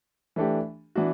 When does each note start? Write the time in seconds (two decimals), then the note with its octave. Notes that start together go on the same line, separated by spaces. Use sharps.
0.36 E3 A3 D4 G4
0.95 E3 B3 D4 F#4